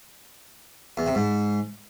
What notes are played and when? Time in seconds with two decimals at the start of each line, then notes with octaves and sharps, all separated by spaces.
0.97 E2
1.06 C3
1.15 G#2